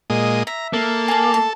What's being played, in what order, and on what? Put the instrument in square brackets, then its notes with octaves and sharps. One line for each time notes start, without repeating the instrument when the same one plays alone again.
[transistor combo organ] A#2 G#3 D#5
[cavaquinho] E5 [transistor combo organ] A#5
[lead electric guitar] A#3 [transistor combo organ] A4
[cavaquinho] G#5 A5
A5